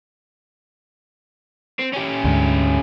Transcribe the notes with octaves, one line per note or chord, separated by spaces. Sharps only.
C4
C#4 G4
D2 G#2